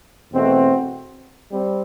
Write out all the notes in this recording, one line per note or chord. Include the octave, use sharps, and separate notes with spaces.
E2 B2 A3 C4 F#4
G3 C4